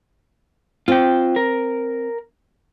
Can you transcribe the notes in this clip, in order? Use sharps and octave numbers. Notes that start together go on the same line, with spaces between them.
C4 F4 G5
A#4